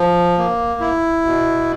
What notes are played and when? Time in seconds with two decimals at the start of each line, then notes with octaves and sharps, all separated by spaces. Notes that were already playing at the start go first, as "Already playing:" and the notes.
Already playing: F3
0.38 A#3
0.80 E4
1.25 B2